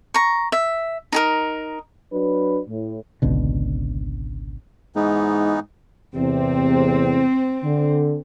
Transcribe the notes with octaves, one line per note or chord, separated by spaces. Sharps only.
A#5 C#6
E5
D#4 G#4 A#4
F#3 D4 B4
A2
G#1 C#2 B2 D3
G#2 E3 B3 D#4
E2 A2 C3 C4
D3